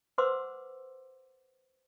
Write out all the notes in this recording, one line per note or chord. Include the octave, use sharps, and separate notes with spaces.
B4 C5 F#5 C6 D6 E6